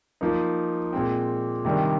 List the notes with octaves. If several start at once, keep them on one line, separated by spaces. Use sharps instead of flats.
F3 A#3 D#4
A#2 G#3 C4
C3 D#3 G3 D4